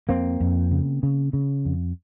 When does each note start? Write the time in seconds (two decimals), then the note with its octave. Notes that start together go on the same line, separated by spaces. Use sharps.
0.09 F2 A#3 C4
0.40 F2
0.71 C#3
1.03 C#3
1.33 C#3
1.65 F2